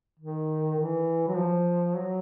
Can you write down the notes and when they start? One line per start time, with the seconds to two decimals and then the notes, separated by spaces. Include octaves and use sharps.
0.20 D#3
0.80 E3
1.28 F#3
1.38 F3
1.96 F#3